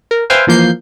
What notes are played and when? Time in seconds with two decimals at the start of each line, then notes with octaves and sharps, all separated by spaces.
0.11 A#4
0.30 B4 C5 E5 F5 G5 G#5
0.47 E3 F3 A#3 G6 C7